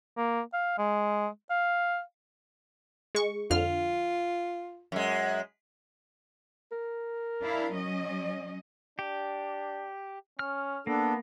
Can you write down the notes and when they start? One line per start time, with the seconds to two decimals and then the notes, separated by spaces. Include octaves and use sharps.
0.17 A#3
0.53 F5
0.78 G#3
1.50 F5
3.15 G#3 C#6
3.51 F2 D3 F4 F6
4.92 F#2 G#3
6.72 A#4
7.43 D4 E4 F5
7.74 F#3 C#4 D#5
8.99 D4 G4
10.39 C#4 F6
10.87 A#3 B3 D4 A4